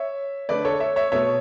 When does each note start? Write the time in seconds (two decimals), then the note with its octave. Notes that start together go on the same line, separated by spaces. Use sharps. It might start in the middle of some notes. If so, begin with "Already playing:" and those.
Already playing: C#5 E5
0.49 D3 A3 B4 D5
0.65 A4 C#5
0.80 C#5 E5
0.96 C#5 E5
1.12 B2 A3 C#5 E5